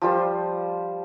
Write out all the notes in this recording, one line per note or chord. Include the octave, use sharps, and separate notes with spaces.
F3 G3 C5